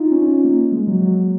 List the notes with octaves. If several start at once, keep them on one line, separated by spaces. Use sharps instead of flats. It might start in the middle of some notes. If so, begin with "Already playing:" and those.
Already playing: D#4 F4
C#4
C#4
C#4
A#3
A#3
G#3
F#3
F#3